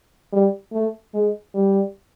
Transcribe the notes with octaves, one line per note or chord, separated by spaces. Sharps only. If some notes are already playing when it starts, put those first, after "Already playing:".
G3
A3
G#3
G3